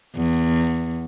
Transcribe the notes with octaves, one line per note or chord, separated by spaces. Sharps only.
E2